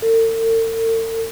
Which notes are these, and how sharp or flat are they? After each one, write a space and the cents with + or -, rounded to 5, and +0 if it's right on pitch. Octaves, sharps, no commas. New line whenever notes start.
A4 +45